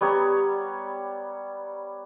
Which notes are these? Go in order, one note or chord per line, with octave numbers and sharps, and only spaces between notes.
G3 B3 C#5 A#5